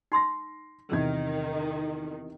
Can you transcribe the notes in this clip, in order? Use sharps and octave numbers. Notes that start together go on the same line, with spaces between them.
D#4 C6 E6 A#6 C7
E2 C3 D#3 G#6